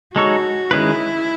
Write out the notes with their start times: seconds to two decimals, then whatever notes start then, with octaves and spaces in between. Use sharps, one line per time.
0.16 G#3 D#4 F#4 A4 C#5
0.71 D#3 G#3 C#4 E4 G#4 B4